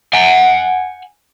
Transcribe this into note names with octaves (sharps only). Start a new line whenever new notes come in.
F#5 G#5